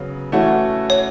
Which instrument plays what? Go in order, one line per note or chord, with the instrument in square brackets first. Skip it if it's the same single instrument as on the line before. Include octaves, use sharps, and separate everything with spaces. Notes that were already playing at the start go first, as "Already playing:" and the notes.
Already playing: [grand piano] C#3 F#3 B3
E3 A3 C#4 F#4
[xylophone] C#5